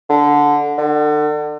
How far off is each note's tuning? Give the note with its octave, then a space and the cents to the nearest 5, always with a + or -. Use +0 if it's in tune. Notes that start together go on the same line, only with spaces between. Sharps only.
D3 -5
D3 +35